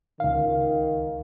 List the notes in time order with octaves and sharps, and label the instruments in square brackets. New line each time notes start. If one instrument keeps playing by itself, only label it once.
[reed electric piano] C#2 F5 [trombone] D#3